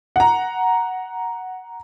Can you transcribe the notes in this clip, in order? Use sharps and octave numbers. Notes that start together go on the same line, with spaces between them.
F#5 A#5